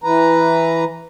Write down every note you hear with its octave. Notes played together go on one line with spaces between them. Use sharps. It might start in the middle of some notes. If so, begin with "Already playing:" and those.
E3 B4 A#5